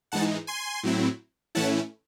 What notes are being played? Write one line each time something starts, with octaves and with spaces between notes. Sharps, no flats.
G#2 E3 G#3 D#4 F#5 A5
G#5 C6
A2 F#3 C4 E4
A2 E3 A3 C#4 E4 F#5 A5